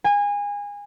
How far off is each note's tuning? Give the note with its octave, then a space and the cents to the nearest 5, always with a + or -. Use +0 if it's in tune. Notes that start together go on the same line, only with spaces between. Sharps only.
G#5 -25